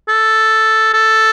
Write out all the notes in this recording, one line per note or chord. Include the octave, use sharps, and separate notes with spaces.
A4
A4